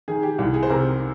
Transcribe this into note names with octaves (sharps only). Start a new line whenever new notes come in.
D#3 G#4
G4
C2
G#4
C5
C3 A#4